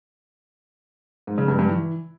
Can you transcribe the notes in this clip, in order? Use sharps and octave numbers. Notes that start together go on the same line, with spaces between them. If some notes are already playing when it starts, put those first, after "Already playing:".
G#2
C#3
G2
G2
E3